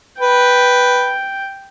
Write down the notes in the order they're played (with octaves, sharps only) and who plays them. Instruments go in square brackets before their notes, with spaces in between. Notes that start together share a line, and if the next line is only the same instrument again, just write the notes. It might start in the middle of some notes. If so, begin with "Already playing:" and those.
[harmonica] B4 [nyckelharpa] G5